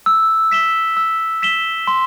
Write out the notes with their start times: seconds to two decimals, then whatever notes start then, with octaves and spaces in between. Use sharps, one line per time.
0.06 E6
0.52 B6 E7 G7
0.97 E6
1.42 B6 E7 G7
1.87 C6